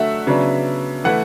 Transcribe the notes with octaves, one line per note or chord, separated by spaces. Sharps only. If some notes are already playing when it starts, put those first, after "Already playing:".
Already playing: D3 F#3 A3 E5 F#5
C#3 F#3 B3 D4
E3 A3 E4 F#5